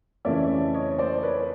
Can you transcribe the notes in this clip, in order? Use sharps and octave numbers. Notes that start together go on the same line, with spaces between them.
F2 C#3 E3 A3 C#4 D5 E5
C#5 D#5
C5 D5
B4 C#5